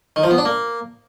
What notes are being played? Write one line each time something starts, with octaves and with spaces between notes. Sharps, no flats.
D#3
F3
B3
D4
A#3